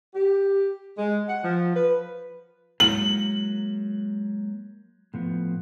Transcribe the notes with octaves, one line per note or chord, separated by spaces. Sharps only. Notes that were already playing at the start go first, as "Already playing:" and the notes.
G4
G#3
F#5
F3
B4
F#3 G#3 A#3 F#7
A2 F3 B3